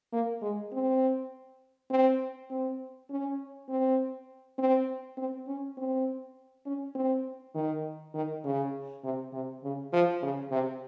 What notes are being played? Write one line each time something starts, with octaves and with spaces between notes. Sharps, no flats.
A#3
G#3
C4
C4
C4
C#4
C4
C4
C4
C#4
C4
C#4
C4
D#3
D#3
C#3
C3
C3
C#3
F3
C#3
C3